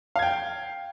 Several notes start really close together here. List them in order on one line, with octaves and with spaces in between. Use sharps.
F5 G#6 G5